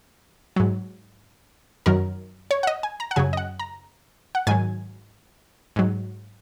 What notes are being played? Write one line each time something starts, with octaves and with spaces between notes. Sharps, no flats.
G#2 F#3
F#2 D#3 F#3 A#4
C#5
F#5
D#5
G#5
A#5
F#5
F#2 C#3 F#3 G#5
D#5
F#5
A#5
F#5
G#2 D#3 F#3 G#5
G#2 F#3